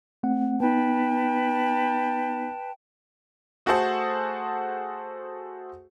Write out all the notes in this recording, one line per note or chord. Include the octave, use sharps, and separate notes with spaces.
A3 C4 F#5
B3 D#4 B4 G5 A5
A3 F#4 G#4 A4 C5 F#5